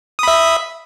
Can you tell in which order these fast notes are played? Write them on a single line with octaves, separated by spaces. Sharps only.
D#6 B5 E5